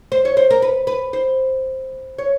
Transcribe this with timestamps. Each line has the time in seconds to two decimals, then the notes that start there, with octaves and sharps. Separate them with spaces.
0.12 C5
0.25 C#5
0.37 C5
0.50 A#4
0.62 B4
0.87 B4
1.13 C5
2.18 C#5